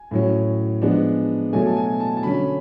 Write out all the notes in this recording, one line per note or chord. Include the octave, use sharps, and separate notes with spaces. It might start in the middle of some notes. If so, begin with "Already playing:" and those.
Already playing: G#5
A2 F#3 C#4
F3 G#3 B3 D4
B2 F#3 A3 G#5
A5
G#5
A5
A5
D3 F#3 C#4 B5